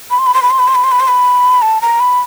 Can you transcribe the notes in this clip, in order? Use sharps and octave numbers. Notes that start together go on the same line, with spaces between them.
B5
C6
B5
C6
B5
C6
B5
C6
B5
C6
B5
C6
B5
A5
A#5
B5